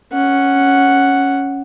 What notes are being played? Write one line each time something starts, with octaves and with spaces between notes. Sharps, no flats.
C#4 F#5